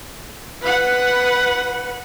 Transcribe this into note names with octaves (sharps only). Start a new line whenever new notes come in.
B4 F#5